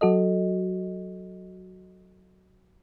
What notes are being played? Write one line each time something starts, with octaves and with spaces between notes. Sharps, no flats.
F#3 F#4 A4 D#5